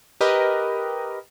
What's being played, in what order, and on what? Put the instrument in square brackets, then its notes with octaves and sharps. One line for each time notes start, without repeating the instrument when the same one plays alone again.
[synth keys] G4 A#4 B4 D#5